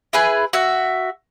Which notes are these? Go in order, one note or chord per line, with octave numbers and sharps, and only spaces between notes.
E4 G#4 B4 G#5
F#4 E5